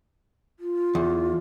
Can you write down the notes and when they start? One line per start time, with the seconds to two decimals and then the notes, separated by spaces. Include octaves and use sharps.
0.60 F4
0.95 E2